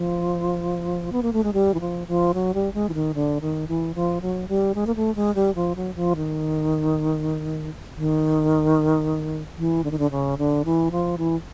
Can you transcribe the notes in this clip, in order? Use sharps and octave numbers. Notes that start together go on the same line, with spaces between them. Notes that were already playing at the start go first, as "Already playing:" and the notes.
Already playing: F3
B3
A#3
A3
G#3
G3
E3
F3
F3
F#3
G3
G#3
E3
D#3
D3
D#3
E3
F3
F#3
G3
G#3
A#3
A3
G#3
G3
F3
F#3
F3
D#3
D#3
E3
D3
D#3
D3
C#3
D3
E3
F3
E3